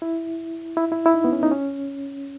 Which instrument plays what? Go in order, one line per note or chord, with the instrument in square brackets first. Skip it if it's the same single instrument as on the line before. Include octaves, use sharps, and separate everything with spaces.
[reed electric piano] E4
E4
E4
E4
D#4
B3
C#4
D#4
C#4